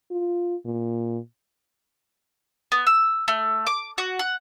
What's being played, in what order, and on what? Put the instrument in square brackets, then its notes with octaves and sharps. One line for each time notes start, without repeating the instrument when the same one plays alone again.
[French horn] F4
A#2
[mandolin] B3
E6
A3
D6
F#4
F#5